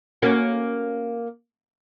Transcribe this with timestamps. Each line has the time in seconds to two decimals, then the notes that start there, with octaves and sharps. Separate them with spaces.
0.22 A#3 C#4 F#4